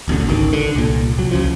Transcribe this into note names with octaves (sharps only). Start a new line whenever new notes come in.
D1 A1 B2 D3
G#1 C#2 D#3
D3
C2 A#2
C2 F#3
C#2 C#3 F3